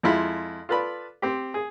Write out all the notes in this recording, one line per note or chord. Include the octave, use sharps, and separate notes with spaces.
F2 G#3 E4 F4 B5
F4 A4 B4 D5 B5
C4 G4
G#4